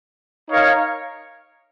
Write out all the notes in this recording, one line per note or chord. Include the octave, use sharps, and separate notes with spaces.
D#4 A#4 C#5 F5